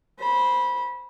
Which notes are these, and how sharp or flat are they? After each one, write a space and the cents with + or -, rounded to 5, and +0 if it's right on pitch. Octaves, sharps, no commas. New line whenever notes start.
C5 +0 B5 -20